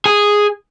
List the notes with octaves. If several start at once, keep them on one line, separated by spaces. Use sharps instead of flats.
G#4